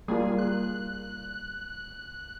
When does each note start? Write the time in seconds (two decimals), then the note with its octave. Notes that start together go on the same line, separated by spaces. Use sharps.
0.08 G3 A#3 F4 G#4
0.38 F#6